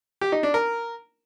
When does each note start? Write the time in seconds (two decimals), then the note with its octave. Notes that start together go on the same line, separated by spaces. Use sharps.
0.21 G4
0.32 D#4
0.43 D4
0.54 A#4